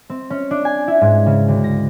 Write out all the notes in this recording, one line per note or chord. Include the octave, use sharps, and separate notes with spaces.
C4
C#4
D4
G#5
E4
G#2
C#3
D2
A#6